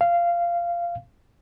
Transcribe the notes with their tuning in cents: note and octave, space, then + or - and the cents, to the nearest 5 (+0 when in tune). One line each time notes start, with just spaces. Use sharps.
F5 -15